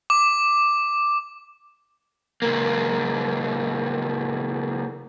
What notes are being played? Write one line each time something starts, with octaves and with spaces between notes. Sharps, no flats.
D6
C#2 A#3